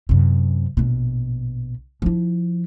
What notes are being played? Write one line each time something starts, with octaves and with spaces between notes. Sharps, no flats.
F#2 C3
A#1 B2
F3 E4